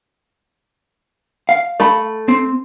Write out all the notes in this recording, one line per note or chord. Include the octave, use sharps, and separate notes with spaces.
F5
A3 B5
C4